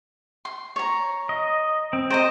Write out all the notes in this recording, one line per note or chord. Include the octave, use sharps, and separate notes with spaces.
C6
C#5 A#5
D#5
C4
C5 D#5 G5 A#5 D#6